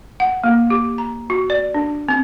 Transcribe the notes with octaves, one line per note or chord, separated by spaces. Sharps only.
F#5
A#3
G4
A#5
F#4
D5
D4
C4